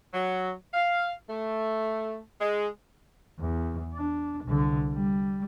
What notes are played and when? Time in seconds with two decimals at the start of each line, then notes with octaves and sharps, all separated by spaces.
0.13 F#3
0.73 F5
1.29 A3
2.41 G#3
3.39 E2
3.94 D4
4.44 C2 D3
4.93 G3